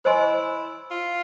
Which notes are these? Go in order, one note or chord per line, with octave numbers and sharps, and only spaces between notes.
E4 C5 D#5 G#5 C6
F4